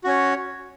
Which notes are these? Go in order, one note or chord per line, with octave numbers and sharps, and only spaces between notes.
C#4 F#4 C#5